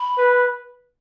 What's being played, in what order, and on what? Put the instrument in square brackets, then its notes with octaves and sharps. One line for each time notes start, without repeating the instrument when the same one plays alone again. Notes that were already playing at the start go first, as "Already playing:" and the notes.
Already playing: [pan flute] B5
[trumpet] B4